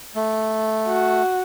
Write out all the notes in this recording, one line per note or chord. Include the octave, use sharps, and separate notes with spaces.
A3
F#4